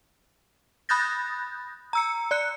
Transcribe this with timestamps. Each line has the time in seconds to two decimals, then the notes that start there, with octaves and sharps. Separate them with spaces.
0.89 B5 D#6 F#6 G6 A6 A#6
1.93 A#5 E6 C#7
2.31 D5 F#6 C#7